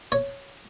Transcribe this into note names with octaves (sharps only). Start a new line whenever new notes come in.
C#5